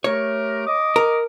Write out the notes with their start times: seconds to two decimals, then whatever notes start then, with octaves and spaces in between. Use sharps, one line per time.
0.04 A3 G4 A#4 C#5
0.66 D#5 D6 D#6
0.96 A#4